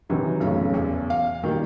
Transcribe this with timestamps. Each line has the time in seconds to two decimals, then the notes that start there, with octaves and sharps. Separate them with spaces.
0.09 C3 D#3 E3 F#3
0.40 B1 F#2 A2 C#3
0.74 E2
1.10 F5
1.43 D#3 G3 A#3